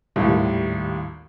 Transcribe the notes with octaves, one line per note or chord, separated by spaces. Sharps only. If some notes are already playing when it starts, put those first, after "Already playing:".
G#1 D#2 A2 G3